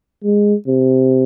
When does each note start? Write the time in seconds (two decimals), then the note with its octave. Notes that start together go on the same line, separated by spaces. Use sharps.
0.24 G#3
0.68 C3